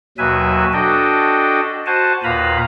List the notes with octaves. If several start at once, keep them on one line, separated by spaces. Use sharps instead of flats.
D#2 B2 F#3 B4 E5 G#5
D4 F#4 A4 D#5 G5
F#4 C5 F#5 G#5 A5
D#2 A#2 B4 F5 A#5 B5